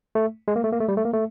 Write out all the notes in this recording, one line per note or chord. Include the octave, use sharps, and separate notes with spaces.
A3
G#3
A#3
A3
A#3
A3
G3
A3
A#3
A3